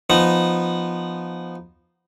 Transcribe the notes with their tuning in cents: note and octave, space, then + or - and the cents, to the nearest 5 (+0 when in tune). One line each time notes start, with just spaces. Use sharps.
F3 -5 B3 +0 D#4 -10